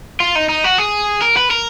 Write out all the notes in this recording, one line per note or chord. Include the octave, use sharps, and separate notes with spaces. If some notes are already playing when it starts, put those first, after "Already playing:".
F4
D#4
D#4
F#4
G#4
A#4
B4
A#4